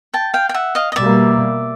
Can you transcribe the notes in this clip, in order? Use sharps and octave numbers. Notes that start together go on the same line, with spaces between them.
G5 A5
F5 G5
G5
E5 F#5
D#5 F5
D#5
B2 G3 A#3 D5 E5